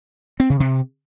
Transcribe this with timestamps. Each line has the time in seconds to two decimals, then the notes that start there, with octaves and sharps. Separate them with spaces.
0.40 C4
0.50 C#3
0.60 C3